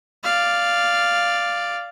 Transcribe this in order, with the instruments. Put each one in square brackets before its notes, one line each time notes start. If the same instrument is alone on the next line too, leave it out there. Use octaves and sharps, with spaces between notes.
[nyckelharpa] D5 F5